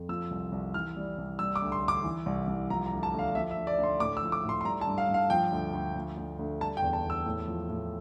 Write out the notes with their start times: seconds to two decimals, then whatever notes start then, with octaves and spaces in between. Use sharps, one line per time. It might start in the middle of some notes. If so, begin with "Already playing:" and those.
Already playing: F2
0.09 F3 E6
0.31 C2
0.52 C2
0.74 E3 F6
0.96 G3
1.18 C2
1.39 G3 E6
1.56 D6
1.62 D2
1.72 C6
1.82 D2
1.88 D6
2.04 E3
2.26 C2
2.48 C2
2.70 F3 A#5
2.86 A#5
2.91 D2
3.03 A5
3.13 D2
3.19 F5
3.35 F3 E5
3.51 E5
3.56 D2
3.67 D5
3.78 D2
3.83 C6
4.00 A2 D6
4.17 E6
4.22 F3
4.32 D6
4.44 A2
4.49 C6
4.61 C6
4.65 G3 A#5
4.81 A5
4.87 G2
4.98 F5
5.09 G2
5.14 F5
5.30 F3 G5
5.52 D2
5.74 D2
5.95 F3
6.17 D2
6.39 D2
6.61 G3 A5
6.77 G5
6.82 E2
6.93 A5
7.04 E2
7.10 E6
7.26 A2
7.48 F3
7.69 A2